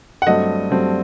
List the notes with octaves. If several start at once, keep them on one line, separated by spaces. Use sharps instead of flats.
F#5
G2 F#3 A3 C4 D#5
G2 F#3 A3 C4